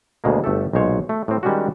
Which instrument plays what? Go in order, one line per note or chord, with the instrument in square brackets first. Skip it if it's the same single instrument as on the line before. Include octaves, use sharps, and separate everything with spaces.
[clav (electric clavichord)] D2 B2 G#3 A#3
G1 A3 G4 A4
B1 A#2 G#3 C5 C#5
A3
A2 C4
D#3 G3 G#3 C#4 D4 F#4